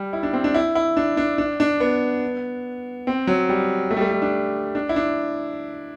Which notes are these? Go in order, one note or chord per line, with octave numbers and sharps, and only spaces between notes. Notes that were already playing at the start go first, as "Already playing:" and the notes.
Already playing: G3
E4
D4
C4
D4
E4
E4
D4
D4
D4
D4
B3
C4
F#3
G3
A3
G3
A3
G3
D4
D4
E4
D4